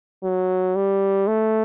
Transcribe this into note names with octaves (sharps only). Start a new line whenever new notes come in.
F#3
G3
A3